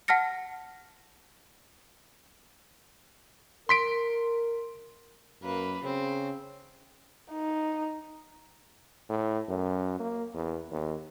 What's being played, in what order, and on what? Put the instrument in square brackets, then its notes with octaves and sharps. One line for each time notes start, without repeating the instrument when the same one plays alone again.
[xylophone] F#5 A5 F6 A#6 C#7
[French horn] A#4 [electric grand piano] C6 B6 D7
[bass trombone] F#2 [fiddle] A#3 B4
[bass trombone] C#3 [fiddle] C4
[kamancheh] D#4
[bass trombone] A2
F#2
A#3
E2
D#2